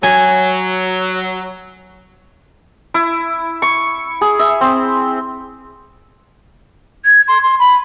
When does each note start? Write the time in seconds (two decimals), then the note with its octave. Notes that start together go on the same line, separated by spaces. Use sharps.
0.03 F#3 G#5
2.94 E4
3.62 C#6
4.21 G#4
4.39 E5
4.61 C4
7.05 G#6
7.28 C6
7.43 C6
7.59 B5